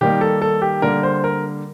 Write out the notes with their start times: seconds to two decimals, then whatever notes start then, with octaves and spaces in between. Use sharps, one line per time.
0.01 D#3 G3 A#3 D#4 G4
0.21 A4
0.42 A4
0.62 G4
0.82 D3 G3 A#3 A#4
1.03 C5
1.24 A#4